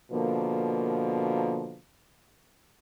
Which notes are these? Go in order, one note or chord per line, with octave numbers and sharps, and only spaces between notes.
B2 D3 F3 A#3